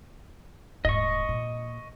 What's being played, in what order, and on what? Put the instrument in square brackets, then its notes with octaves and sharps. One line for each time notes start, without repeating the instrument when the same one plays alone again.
[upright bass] D#1 G#2 [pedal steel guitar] D#5 C#6
[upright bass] A#2